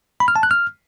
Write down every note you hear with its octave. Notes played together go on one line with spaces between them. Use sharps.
B5
F6
A5
F#6
F6